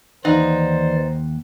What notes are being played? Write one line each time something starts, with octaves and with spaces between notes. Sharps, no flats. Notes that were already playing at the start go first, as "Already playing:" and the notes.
D#2 E3 D#4 C5 D5 F5 F#5